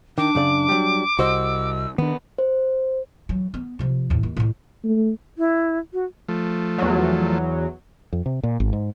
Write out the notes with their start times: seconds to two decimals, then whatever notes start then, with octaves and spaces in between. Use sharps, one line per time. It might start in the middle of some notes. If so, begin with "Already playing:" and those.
0.18 D#3 D4 D6
0.35 F#2 C#3 D5
0.68 F#3 G3
1.19 C2 F#4 C5 D#5 E6
1.98 D#3 B3 D4
2.38 C5
3.29 E3 F#3
3.54 B3
3.79 C3 F3
4.10 D#2 A2
4.23 D#2
4.37 A2 G#3
4.84 A3
5.38 E4
5.93 F#4
6.28 F3 A3
6.78 E2 F#3
8.13 F2
8.26 C3
8.43 A#2
8.60 G#1
8.73 G#2